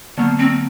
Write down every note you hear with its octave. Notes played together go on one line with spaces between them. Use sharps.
D3 F#3 A#3 B3
C4